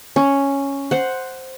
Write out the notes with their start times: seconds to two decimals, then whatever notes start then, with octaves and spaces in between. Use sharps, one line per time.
0.16 C#4
0.91 C5 F#5